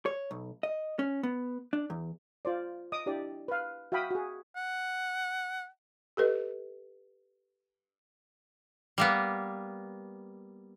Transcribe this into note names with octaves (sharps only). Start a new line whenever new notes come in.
C#5
B1
D#5
C#4
B3
D4
E2
F4 C5 D5
D#5 D6 D#6
D4 E4 G4 D5
B4 F5
F#4 E5 F5 G5 B5 D#6
F#4 G#4
F#5
G4 A4 B4 D#5
G3 A#3 B3